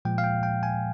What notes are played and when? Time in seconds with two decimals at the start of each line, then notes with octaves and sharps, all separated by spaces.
0.05 A#2 F3 G#3 G5
0.18 F5
0.24 G5
0.43 G5
0.63 G#5